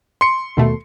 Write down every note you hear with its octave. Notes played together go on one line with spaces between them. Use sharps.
C6 C#7
D#2 B2 A3